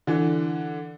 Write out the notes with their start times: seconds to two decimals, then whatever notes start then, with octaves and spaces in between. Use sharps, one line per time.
0.07 D3 E3